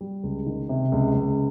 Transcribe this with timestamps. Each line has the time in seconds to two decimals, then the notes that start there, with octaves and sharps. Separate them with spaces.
0.01 G3
0.23 C#2
0.46 D#3
0.69 C3
0.92 C#2
1.15 C#2